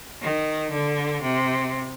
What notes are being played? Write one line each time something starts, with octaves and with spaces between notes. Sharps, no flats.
D#3
D3
C3